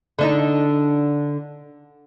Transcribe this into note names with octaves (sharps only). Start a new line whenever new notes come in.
D3 D4 D#4